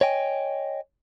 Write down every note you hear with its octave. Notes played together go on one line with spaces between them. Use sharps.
C#5 D#5 G5 G#5